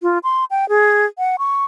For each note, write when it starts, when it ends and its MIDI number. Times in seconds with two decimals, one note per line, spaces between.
0.02 0.18 65
0.24 0.45 84
0.51 0.68 79
0.69 1.06 68
1.19 1.36 78
1.39 1.65 85